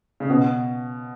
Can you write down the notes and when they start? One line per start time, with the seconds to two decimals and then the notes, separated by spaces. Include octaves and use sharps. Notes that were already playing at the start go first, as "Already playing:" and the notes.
0.20 C#3
0.30 B2